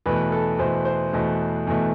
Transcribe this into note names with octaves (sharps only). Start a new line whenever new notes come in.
E2 B2 A3 B4
A4
E2 B2 A3 C5
C5
E2 B2 A3
E2 B2 A3